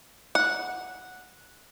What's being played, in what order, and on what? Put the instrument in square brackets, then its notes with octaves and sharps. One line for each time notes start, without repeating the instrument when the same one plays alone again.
[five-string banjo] F#5